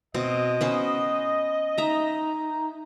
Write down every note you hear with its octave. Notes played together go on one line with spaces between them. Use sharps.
B2 C4 D#5
B3 C#4 C5
D#4 E5 A#5